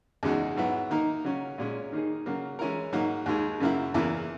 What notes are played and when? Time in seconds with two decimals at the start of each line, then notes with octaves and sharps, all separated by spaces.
0.23 E2 C#3 G#3 D#4 F#4
0.56 G#2 F#3 B3 E4
0.90 D#3 A#3 D#4 A#4
1.25 C#3 F#3 C#4
1.58 A#2 G#3 C#4
1.92 D#3 A#3 D#4 G#4
2.26 C#3 F#3 A#3
2.59 E3 G#3 C#4 E4 A#4
2.93 G#2 F#3 A#3 D#4
3.26 D#2 D#3 G#3
3.60 F#2 C#3 F#3 A#3 E4
3.94 E2 C#3 E3 A#3 E4